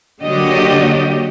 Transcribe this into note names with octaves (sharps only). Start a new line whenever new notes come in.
D3 F#3 A#3 G4 D5 D#5